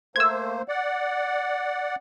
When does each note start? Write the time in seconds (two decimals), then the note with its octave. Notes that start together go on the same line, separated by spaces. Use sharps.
0.16 A3 A#3 C5 E6 G#6
0.68 D5 F#5